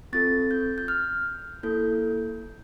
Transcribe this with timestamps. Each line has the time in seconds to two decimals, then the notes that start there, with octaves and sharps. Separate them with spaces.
0.13 C4 F4 A4 A6
0.51 G6
0.78 G6
0.88 F6
1.63 A#3 E4 A4 G6